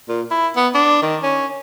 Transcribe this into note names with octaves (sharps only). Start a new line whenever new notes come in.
A#2
E4
B3
D4
D#3
C#4